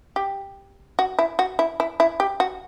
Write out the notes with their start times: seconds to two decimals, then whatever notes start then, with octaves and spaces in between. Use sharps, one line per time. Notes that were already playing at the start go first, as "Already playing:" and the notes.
0.16 G4
0.99 F#4
1.19 E4
1.39 F#4
1.59 E4
1.80 E4
2.00 E4
2.20 G4
2.40 F#4